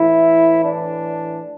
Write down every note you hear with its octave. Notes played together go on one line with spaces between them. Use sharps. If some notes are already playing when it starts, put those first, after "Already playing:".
Already playing: A2 E3 E4
D4